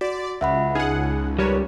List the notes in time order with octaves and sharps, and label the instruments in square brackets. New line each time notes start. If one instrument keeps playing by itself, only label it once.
[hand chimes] F#4 [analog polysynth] D5
[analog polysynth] C#2 [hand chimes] E5 F#5 B5
[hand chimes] D#4 [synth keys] G#4 F#5
[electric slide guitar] G3 [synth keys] A#4 B4 C#5